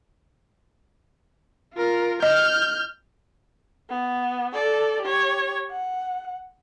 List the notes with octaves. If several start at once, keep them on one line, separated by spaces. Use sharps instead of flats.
F4 A#4
D#5 F6 G6
B3
A4 D5
G4 C#5
F#5